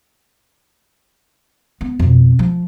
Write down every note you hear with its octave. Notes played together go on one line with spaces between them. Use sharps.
B3
F2 B2
F3